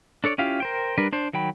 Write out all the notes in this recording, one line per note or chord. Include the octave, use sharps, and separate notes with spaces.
D4 A4 C#5 D5
C#4 E4 F4 G4 F5
A#4 C5 G5
G3 D4 A#4 B4
D4 C5
D#3 F#3 G5 B5